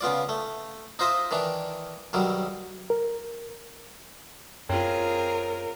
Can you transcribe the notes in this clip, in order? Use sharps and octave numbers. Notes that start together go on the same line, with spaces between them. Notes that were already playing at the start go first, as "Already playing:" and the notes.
C#3 B3 F4 D5
A3
D#4 F4 C5 D#5 E5
D#3 E3 D4
B1 D#3 F#3 G3
A#4
F#2 C4 F4 G#4 A#4 C#5 G5